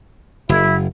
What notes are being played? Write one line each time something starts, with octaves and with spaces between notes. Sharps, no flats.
F#1 E4